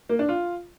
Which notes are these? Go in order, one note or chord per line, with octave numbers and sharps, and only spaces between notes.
A#3
D4
F4